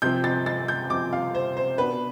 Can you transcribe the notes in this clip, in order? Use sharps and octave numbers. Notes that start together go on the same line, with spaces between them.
C3 F3 C4 G6
A6
A6
G6
C3 F3 C4 D6
F5
C5
C5
B2 B3 D4 B4